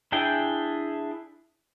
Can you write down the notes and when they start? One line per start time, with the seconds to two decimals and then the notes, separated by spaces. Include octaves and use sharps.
0.12 D4 E4 G#4 G5